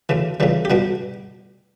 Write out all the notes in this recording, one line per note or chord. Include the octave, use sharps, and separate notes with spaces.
D2 C#3 E3
C#2 C#3 E3 G3
G4
C#2 B2 G3 F#4